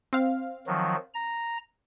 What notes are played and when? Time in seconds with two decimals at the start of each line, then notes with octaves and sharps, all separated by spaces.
0.13 C4 F5
0.67 D#3 F3 F#3
1.14 A#5